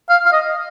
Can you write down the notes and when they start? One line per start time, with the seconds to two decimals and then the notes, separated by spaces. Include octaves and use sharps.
0.09 F5
0.25 F5
0.32 D#5